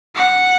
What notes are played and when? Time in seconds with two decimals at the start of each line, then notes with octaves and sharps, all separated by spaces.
0.15 F#5